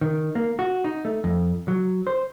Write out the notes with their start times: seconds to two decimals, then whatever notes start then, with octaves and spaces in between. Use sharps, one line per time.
0.01 D#3
0.35 A#3
0.59 F#4
0.84 D#4
1.05 A3
1.24 F2
1.68 F#3
2.07 C5